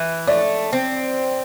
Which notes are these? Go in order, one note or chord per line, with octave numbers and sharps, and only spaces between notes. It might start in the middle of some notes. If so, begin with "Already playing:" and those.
Already playing: E3
A3 D5
C4